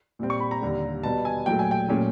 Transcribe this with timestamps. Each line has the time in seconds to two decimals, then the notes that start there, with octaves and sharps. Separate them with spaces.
0.19 A#2 G3 C4
0.30 C#6
0.40 B5
0.51 A#5
0.61 D#2 D3 G3
1.03 B2 G3 B3 A5
1.25 G#5
1.46 A#2 F#3 A3 G5
1.59 G#5
1.71 G5
1.88 A#2 F#3 A3 C#4